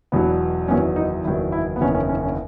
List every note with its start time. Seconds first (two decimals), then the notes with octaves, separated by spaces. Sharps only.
0.12 E1 E2 B2 F#3 B3
0.68 F#1 E2 D#3 F#3 C#4
0.96 D#4
1.25 F#1 E2 D#3 F#3 E4
1.52 E4
1.76 B3
1.81 F#1 E2 D#3 C#4
1.95 C#4
2.09 C#4
2.23 C#4